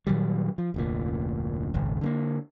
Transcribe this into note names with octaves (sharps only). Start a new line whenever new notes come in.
A#2 D#3 F#3 G3
F3
F1 D2 A#2
D#1 G#1 C#2
D3 A3 A#3